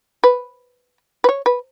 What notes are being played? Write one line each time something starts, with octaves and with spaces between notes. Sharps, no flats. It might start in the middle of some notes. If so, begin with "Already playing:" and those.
B4
B4
C#5
B4